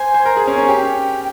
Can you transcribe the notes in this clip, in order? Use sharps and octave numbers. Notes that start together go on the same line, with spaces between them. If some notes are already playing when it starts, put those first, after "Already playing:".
Already playing: C5 G#5
C5
A#4 A#5
G#4
C#4 G#5
C#4
G4 G5